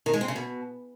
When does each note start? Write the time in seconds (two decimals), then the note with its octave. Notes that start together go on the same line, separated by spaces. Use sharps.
0.06 D#3
0.13 G#3
0.21 C4
0.28 C#3
0.36 B2